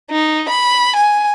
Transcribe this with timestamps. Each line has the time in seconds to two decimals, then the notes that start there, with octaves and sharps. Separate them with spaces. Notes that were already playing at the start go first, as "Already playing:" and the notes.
0.11 D#4
0.49 B5
0.96 G#5